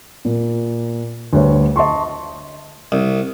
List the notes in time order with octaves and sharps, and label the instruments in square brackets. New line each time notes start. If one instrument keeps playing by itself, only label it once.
[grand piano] A#2
D2 G3 B4 C#5
D#5 A5 C6 C#6
[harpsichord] C2